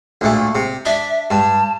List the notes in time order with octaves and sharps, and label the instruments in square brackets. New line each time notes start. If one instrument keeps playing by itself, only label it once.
[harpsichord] D2 A#2 A3
C3
[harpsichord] D4 [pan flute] E5
[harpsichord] G2 [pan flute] A5